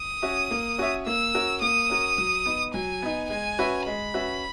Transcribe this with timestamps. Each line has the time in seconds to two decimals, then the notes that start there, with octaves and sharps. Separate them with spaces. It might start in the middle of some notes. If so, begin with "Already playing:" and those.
Already playing: D#6
0.22 C#4 F#4 C#5 E5
0.51 A#3
0.78 C#4 F#4 C#5 E5
1.06 A#3 E6
1.35 C#4 F#4 A#4
1.62 A#3 D#6
1.90 C#4 F#4 A#4
2.18 F#3
2.46 B3 D#4
2.74 F#3 G#5
3.02 B3 D#4
3.30 G#3 G#5
3.59 C#4 F#4 B4 E5
3.86 G#3 B5
4.14 C#4 F#4 B4 E5